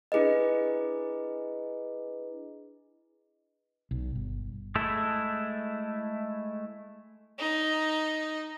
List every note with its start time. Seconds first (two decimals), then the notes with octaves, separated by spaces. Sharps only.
0.12 D4 E4 G#4 B4 D#5
3.91 B1
4.15 G1
4.75 G#3 A3 E4 A4
7.39 D#4